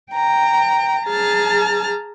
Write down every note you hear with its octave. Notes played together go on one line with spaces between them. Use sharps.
G5 A#5
G#4 A5 A#5 F6